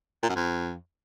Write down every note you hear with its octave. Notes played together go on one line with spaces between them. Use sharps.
A#2
F#2
F2